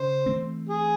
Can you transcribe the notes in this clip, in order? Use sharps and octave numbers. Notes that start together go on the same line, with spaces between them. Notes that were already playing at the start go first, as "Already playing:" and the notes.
Already playing: C#3 C#4 C5
E3 A3 C4
G#4